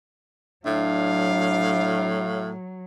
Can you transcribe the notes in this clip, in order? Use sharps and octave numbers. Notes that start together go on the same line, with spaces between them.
A2 F#3 D4 F5